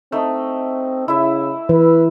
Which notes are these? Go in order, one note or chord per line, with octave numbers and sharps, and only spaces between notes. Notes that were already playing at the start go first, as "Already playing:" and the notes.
A3 C4 D#4
C#3 E4 E5
E3 B4